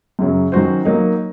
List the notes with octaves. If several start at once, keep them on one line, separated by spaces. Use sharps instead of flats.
F#2 C#3 F#3
D#3 F#3 C#4 F#4 C5
F#3 A#3 D#4